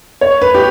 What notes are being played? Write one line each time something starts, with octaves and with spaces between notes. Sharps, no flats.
C#5
B4
G4